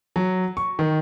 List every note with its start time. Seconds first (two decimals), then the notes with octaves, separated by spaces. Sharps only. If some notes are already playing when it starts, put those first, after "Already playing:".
0.16 F#3
0.57 C#6
0.79 D#3